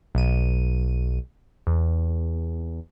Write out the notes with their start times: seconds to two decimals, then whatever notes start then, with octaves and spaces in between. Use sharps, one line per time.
0.15 B1 D#7
1.67 E2